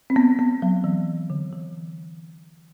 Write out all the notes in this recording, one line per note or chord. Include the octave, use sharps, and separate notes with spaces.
C4
B3
B3
F#3
E3
D3
E3